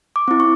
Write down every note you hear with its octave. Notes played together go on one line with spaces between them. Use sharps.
D6
C4 E4
C#6